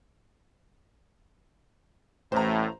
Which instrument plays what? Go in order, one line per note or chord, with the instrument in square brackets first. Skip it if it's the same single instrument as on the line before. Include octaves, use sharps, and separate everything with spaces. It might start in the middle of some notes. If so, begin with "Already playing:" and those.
[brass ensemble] A1 A2 [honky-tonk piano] C5 A#5